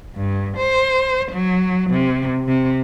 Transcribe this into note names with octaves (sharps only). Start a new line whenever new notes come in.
G2
C5
F#3
C3
C3